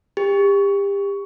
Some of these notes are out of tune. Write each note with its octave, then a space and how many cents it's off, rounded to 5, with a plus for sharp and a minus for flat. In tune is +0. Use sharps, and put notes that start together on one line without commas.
G4 +30